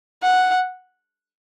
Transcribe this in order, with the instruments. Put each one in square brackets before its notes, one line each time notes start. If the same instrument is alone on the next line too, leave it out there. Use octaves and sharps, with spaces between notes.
[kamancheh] F#5